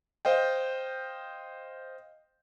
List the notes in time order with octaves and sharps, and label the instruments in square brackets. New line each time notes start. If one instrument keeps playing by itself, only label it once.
[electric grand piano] C5 D#5 F5 G5